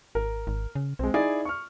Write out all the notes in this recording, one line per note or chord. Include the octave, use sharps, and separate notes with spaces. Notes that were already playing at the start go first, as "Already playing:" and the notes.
G#1 A#4
G#1
C#3
B1 G#3 C4
D#4 E4 G#4 D5
C#6 F6